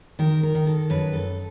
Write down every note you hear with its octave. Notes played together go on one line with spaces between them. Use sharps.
D#3 A#4
A#4
D#3
A4
F#2 B4
A4